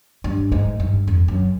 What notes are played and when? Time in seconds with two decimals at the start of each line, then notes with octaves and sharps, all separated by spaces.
0.24 G2
0.52 G#2
0.80 G2
1.07 F2
1.28 F#2